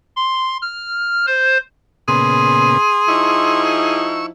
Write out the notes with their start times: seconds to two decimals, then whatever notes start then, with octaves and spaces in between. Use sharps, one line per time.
0.16 C6
0.62 F6
1.26 C5
2.08 A#2 C#3 B3 G#4 C6
3.08 F3 D#4 E4 C#6 E6